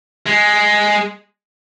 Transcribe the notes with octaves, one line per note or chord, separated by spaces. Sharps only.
G#3